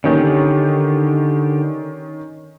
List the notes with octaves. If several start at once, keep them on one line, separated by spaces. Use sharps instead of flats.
D3 D#3 C#4 G4